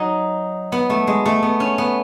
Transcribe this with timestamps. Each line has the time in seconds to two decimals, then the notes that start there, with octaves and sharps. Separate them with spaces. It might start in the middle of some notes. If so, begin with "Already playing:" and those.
Already playing: F#3 D#4
0.72 B3
0.90 A3
1.07 G#3
1.26 A3
1.43 B3
1.60 C#4
1.78 B3